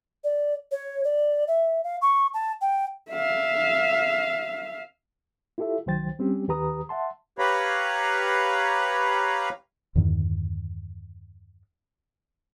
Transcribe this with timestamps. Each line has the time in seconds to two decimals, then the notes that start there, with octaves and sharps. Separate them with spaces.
0.24 D5
0.72 C#5
1.04 D5
1.48 E5
1.84 F5
2.02 C#6
2.34 A5
2.61 G5
3.12 E5 F5
5.58 E4 F4 G4 A4 E5
5.86 C2 D#3 F#3 C5 G5 A6
6.19 G3 C4 C#4 G4
6.48 D#2 D#3 G4 B4 A#5 D#6
6.89 E5 F#5 A5 C6
7.39 G4 B4 C#5 F5 A#5 B5
9.95 E2 G2 D3 D#3